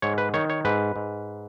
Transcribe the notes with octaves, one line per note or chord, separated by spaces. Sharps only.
G#2 C#5
B4
D#3 C#5
C#5
G#2 B4
G#2